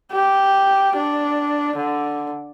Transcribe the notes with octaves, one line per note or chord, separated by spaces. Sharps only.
G4
D4
D3